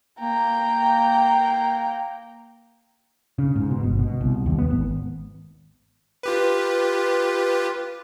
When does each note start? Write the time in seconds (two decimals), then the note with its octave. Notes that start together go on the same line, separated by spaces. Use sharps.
0.20 A#3 G5 A#5
3.39 C#3
3.56 G#2
3.71 B2
3.83 G1
3.99 B2
4.21 C2
4.46 D#2
4.58 B3
4.71 G#1
6.23 F4 G4 B4